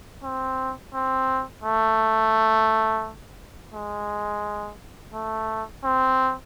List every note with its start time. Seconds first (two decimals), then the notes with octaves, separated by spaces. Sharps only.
0.24 C4
0.94 C4
1.64 A3
3.74 G#3
5.14 A3
5.84 C4